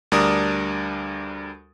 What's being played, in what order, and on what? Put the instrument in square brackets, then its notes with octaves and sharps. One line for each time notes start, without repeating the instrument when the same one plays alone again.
[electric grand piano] D2 G3 D4 A#4 D5 D#6